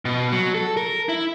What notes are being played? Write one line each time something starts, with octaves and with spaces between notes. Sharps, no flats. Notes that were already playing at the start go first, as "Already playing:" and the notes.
B2
F#3
A4
A#4
E4